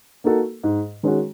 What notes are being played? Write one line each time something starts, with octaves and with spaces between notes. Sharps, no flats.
A#3 D#4 F#4 A4
G#2
D#3 G#3 C#4 F#4